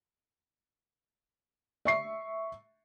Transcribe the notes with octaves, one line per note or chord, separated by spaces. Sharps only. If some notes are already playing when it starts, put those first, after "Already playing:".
E5 C#6 C7